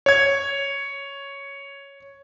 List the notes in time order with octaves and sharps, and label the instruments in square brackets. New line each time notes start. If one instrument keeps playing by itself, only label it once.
[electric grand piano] C#5 G#6